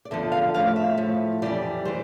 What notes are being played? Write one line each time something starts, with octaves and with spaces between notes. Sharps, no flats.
D5
E2 D3 F3 E5
F5
A2 F3 F5
E5
A2 F3
F2 E3 G3 D5
E3 G3 C5